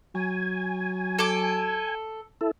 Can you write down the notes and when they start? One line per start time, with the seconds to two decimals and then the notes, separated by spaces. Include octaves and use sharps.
0.15 F#3 G#5
1.19 A4 D6
2.41 E4 A4